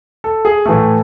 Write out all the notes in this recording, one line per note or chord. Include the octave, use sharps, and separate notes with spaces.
A4
G#4
A2 E3 A3 A4